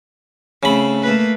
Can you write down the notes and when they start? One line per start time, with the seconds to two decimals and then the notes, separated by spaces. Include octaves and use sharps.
0.63 C#3 A3 C4 B5
1.02 A3 A#3 B4